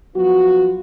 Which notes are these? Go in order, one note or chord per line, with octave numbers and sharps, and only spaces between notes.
F3 F#3 B3 F4 F#4